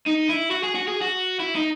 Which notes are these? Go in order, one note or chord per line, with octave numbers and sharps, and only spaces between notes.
D#4
E4
F#4
G#4
F#4
G#4
F#4
E4
D#4